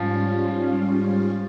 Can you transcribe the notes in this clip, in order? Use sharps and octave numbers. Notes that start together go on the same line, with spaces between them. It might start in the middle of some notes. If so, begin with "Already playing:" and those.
Already playing: G#2 F3 G3 C#4 F4